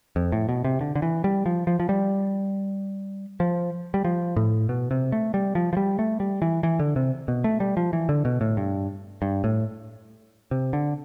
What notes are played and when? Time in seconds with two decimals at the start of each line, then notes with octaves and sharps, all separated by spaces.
0.16 F2
0.32 A2
0.49 B2
0.65 C3
0.81 D3
0.96 D3
1.02 E3
1.24 G3
1.46 F3
1.67 F3
1.80 F3
1.89 G3
3.40 F3
3.94 G3
4.05 F3
4.36 A2
4.69 B2
4.91 C3
5.12 A3
5.34 G3
5.55 F3
5.73 F3
5.77 G3
5.99 A3
6.20 G3
6.42 E3
6.63 E3
6.80 D3
6.96 C3
7.28 B2
7.44 A3
7.60 G3
7.77 F3
7.93 E3
8.09 D3
8.25 B2
8.41 A2
8.57 G2
9.22 G2
9.44 A2
10.51 C3
10.73 D3